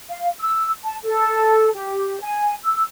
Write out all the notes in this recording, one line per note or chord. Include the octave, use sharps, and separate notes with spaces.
F5
E6
A5
A4
G4
G#5
E6